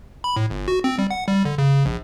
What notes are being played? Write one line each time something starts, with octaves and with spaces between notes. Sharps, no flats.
B5
A2
G1
F#4
C4
G3
F#5
G3
D3
C#3
C#3
A#1